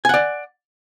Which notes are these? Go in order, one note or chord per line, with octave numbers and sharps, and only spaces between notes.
D5 F#5 G#5